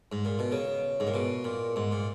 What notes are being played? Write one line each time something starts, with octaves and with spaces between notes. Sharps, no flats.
G#2
A#2
B2
C#3
G#2
A#2
B2
A#2
G#2
A#2